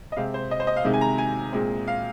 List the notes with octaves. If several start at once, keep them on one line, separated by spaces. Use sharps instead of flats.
D#5
C3 G#3 C4 F5
C5
D#5
C5
D#5
F5
C3 D#3 G#3 C4
G#5
A#5
G#5
A#2 G#3 C4
F5